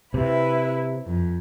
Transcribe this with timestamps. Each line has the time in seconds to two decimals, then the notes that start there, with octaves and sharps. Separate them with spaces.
0.14 C3 E4 B4
1.06 F2